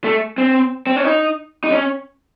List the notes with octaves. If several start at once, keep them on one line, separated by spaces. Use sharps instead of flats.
A3
C4
C4
C#4
D#4
D#4
C#4